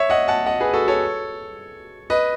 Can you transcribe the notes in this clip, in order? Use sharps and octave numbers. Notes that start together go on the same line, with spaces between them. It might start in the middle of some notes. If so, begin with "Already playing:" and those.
Already playing: C#5 E5
D#5 F#5
F#5 A5
D#5 F#5
G#4 B4
F#4 A4
A4 C#5
B4 D#5